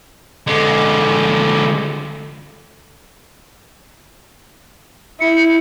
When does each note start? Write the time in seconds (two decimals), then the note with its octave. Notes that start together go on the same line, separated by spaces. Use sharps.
0.47 D3 G#3
5.21 E4 C#7